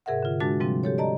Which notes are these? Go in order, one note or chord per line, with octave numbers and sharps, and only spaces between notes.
G#2 C3 G#4 A#4 E5 F#5
D3 F4
G#3 D4 F#4 A5 A6
C3 F3 G3 C4
G4 A4 C#5
D5 D#5 A5 A#5